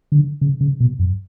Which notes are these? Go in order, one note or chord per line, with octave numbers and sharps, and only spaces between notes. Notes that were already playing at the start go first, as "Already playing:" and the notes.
D3
C#3
C#3
B2
F#2